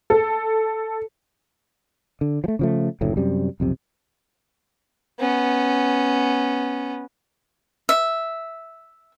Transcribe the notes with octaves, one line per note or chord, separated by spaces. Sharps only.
A4
D3
F3 A3
C#3 F3 A3
F#1 D2 A2
F#2 C3 G3
B1 F2 C3
B3 C#4
E5